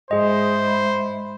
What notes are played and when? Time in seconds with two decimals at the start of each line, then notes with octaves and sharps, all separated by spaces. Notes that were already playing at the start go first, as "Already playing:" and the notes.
0.11 G#2 E4 G#4 C5 D#5
0.67 B5